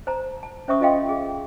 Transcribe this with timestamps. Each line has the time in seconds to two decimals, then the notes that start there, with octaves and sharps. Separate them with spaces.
0.07 C5 A5 A#5
0.43 A5
0.68 C#4 C5 E5 C#6 D#6
0.81 F4 A4 D#5 F5 G5 C6
1.09 G#4